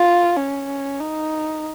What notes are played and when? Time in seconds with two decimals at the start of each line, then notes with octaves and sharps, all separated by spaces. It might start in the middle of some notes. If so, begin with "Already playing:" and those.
Already playing: F4
0.37 C#4
1.00 D#4